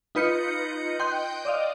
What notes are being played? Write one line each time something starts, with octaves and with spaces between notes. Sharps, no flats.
D#4 F4 B4 D#5 G6 C#7
D#5 G5 C6 F#6 G6
D5 D#5 F5